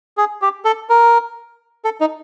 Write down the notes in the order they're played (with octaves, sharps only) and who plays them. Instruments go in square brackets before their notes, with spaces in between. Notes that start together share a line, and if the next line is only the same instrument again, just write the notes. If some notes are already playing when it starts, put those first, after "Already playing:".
[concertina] G#4
G4
A4
A#4
A4
D#4